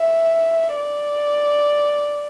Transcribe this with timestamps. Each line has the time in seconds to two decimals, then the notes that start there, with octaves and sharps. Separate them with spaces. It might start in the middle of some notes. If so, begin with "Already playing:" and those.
Already playing: E5
0.76 D5